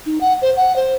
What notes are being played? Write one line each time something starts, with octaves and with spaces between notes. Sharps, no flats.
D#4
F#5
C5
F#5
C5